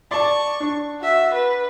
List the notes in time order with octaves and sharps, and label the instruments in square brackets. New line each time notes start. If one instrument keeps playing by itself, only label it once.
[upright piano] D5 A5 [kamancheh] C#6
[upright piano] D4
[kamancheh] F#4 E5
B4